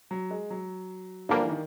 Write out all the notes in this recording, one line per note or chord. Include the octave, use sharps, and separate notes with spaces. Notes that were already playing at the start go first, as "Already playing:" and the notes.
F#3
G#3
F#3
G2 D3 F3 G3 A#3 D4
E3
D#3